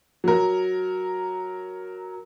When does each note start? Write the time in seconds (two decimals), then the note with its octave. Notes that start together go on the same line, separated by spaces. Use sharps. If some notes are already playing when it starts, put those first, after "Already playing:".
0.24 F#3 A#4